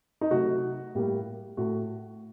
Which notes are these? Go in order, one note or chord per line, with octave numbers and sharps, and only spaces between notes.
D#4
C3 F#3 A3 F#4
A2 G3 A#3
A2 A3 F#4